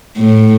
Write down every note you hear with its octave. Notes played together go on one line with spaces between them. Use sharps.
A2